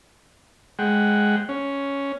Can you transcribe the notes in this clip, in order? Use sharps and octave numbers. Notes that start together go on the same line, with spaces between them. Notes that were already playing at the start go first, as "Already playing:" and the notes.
G#3 F#5 G5
C#4